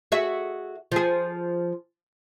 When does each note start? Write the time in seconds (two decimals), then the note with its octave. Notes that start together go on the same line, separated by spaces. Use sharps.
0.12 F#4 G#4 E5
0.92 F3 G#4